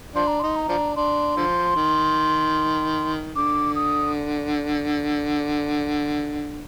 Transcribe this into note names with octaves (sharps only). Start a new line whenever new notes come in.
F3 D4 C6
A#5
D#4 C6
A#5
F3 D4
D4 C6
D3 F3
D#3
D3 D6
D#6